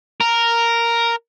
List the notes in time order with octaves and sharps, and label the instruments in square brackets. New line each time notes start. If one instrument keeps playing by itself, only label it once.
[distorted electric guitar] A#4